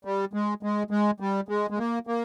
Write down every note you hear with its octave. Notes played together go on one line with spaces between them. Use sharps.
G3
G#3
G#3
G#3
G3
G#3
G#3
A#3
A#3